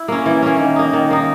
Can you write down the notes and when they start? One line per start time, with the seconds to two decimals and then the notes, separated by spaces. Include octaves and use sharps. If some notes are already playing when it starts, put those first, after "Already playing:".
Already playing: E4
0.08 A#3 C#4
0.26 E3
0.42 A#3 C#4
0.59 D#3
0.76 A#3 D#4
0.93 D#3
1.11 A#3 D#4